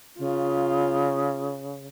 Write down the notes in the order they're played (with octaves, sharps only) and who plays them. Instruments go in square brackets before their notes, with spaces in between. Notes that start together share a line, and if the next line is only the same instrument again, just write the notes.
[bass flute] C#3 [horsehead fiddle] F4